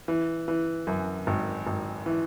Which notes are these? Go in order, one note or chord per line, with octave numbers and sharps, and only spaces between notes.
E3
E3
F#2
G#1
G#1
E3